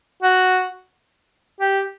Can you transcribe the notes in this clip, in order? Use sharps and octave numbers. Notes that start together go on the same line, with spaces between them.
F#4
G4